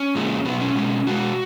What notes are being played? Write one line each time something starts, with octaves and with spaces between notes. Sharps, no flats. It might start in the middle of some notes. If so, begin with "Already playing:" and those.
Already playing: C#4
A#2 F3 G#3
B2 F#3 B3
C#4
B2 G#3
B2 G#3 F#4